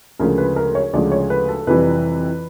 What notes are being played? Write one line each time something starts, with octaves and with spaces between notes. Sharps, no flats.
D2 C#3 F3 G#3 A#4
B4
A#4
C#5
D2 C#3 F3 G#3 D5
C#5
B4
A4
F2 C3 E3 G3 B4